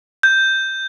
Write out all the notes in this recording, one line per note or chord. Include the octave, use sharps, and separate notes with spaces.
G6